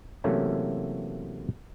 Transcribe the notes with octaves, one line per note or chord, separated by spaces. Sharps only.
C3 E3 F#3 A3 A#3 C#4